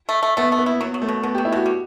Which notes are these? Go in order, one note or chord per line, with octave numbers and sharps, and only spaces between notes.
A3
A3
A3 B3
A3
B3
E4
F#3 B3
F#3
A3
B2
B2 B3
G4
F#3
E4
B2 F#4
G3